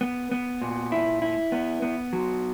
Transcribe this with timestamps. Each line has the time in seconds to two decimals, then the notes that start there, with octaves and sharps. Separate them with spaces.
0.01 B3
0.31 B3
0.61 A#2
0.92 E4
1.22 E4
1.52 B3
1.82 B3
2.13 F#3